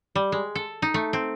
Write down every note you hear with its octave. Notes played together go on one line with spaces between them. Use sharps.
G3
G#3
A4
D#4
A3
C4